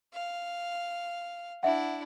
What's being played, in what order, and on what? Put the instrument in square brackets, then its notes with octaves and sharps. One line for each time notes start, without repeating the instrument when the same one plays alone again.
[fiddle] F5
[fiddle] D4 E4 [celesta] E5 F#5